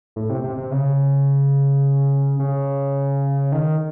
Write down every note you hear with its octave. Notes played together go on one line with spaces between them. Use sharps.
A2
C3
C3
C3
C#3
C#3
D#3